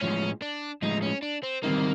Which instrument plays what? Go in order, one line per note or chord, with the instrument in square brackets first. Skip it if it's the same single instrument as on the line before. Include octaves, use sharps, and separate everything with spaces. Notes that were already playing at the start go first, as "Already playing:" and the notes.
[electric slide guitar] A2 F3 G#3 [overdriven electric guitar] C#4
[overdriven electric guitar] D4
[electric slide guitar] A2 F3 G#3 [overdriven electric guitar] D#4
[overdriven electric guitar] C#4
D4
C4
[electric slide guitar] D#3 G3 C4 D#4 [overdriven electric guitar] A#3